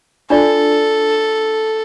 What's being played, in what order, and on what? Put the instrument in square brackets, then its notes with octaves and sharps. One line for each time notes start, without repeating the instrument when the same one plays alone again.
[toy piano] D4 F4 D5 [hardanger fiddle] A4